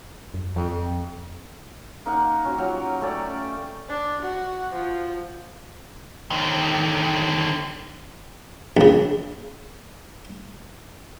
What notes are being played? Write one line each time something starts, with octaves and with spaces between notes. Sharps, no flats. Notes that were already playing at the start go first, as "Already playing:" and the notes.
F#2
F2 F3
F2
A#3 D#4 F5 F#5
C#4 F#4 C5
F#3 F4 G4 F5
A3 C#4 G4 D5
D4
F#4
F3
D3 D#3
A#1 C#3